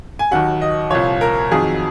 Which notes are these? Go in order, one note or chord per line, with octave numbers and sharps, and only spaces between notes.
G#5
D#2 D#3 F#3 F#5
D#5
C2 A#2 F3 C#5
A#4
F2 D#3 F#3 G#4